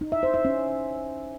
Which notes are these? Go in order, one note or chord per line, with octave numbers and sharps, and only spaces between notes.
D#4
E5
C5
E5
C#4